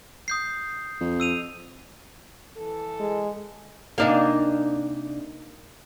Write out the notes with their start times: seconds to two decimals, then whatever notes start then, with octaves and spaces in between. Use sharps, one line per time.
0.28 D#6 G6 C7
1.01 F2
1.20 E6 D#7 F7
2.57 E3 A4
3.00 G#3
3.98 C3 A#3 D4 D#4 F5 G#5